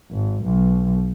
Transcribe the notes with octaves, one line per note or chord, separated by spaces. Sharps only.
G#1
B1